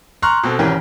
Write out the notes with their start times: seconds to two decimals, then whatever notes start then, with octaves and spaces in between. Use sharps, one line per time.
0.22 A#5 C6 C#6 F6 F#6
0.43 B2 C4 A4
0.59 G#1 E3 C#4 G4 A#4